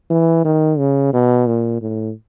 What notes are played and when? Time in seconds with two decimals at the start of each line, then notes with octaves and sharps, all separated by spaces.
0.10 E3
0.45 D#3
0.78 C#3
1.13 B2
1.47 A#2
1.81 A2